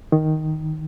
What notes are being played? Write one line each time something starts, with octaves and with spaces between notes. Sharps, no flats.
D#3